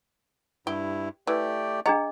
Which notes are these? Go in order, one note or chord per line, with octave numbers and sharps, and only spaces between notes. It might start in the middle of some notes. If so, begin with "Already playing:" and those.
G2 E4 G4
E3 A3 G4 D5
D4 G#4 D#5 F#5 A#5